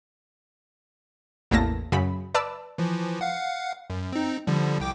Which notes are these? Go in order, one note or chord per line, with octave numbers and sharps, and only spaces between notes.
A1 E2 A3 A#3 A5 A#6
F#2 C#3 F#3 B5
B4 D5 A5 E6
E3 F3
F5 F#5
F#2
C4 D#4
D3 F3 G3
C2 G5 D6